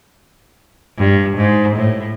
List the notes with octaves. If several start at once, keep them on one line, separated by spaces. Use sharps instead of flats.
G2
G#2
A2